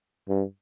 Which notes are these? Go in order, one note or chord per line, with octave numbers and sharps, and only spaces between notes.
G2